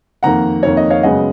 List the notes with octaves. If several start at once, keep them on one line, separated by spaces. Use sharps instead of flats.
F2 D#3 A#3 F#5 A#5
F2 D#3 A#3 C#5
D#5
C#5 F5
F#2 C#3 G#3 B3 D#5 F#5